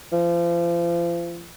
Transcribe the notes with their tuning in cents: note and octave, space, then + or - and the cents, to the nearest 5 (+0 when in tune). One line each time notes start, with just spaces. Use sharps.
F3 -35